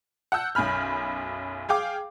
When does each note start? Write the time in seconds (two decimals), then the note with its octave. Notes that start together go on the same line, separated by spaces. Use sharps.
0.32 F#5 A5 E6 G6
0.55 B1 F#2 G#5 B5 F6
1.69 G#4 F5 G5 D6